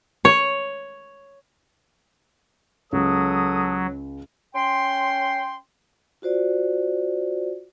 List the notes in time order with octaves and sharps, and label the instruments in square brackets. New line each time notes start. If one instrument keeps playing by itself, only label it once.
[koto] C#5
[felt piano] C#2 [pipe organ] F#3 [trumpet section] A4 D#6
[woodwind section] C#4 G5 C6
[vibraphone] F4 F#4 C5 D5